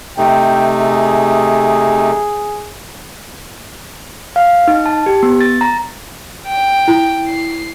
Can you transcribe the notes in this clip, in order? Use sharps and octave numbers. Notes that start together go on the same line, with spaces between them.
C3 A3 D#4 G5
G#4
F5
D#4
A5
G4
B3
A6
A#5
G5
E4
C7